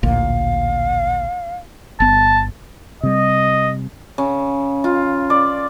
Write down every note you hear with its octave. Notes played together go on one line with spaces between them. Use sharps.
A1 D2 A#2 F5
G1 B3 A5
C3 G3 D#5
C#3
F4
D5